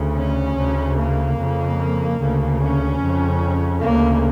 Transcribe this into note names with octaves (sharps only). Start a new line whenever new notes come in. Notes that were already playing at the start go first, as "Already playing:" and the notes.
Already playing: D2 C#3
C#4
D2 C#3
A#3
F2 C#3
D2 C#3
C#4
F2 C#3
D2 C#3 A#3